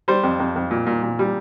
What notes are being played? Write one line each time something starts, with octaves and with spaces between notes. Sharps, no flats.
G3 C5
F2
F2
F2
A#2
A#2
A#2
G3